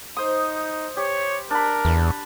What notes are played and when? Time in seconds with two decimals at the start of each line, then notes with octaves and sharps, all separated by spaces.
0.17 D#4 C5 D#6
0.97 G4 C#5
1.50 D4 A#4 B5
1.85 E2